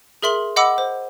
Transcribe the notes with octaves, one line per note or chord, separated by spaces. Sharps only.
G#4 A#4 E5 C6 F#7
D#5 F#5 B5 D6 E6
C5